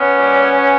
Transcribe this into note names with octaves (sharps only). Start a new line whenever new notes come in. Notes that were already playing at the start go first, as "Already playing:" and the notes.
Already playing: B3 C#4
A#2 G3